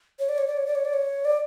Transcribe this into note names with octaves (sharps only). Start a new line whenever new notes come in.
C#5
D5
C#5
D5
C#5
D5
C#5
D5
C#5
D5